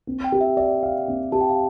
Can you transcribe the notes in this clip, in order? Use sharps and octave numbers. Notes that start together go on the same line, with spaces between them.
C4
G5
G4
E5
D5 E5
F5
C4
G4 A5
G5
F5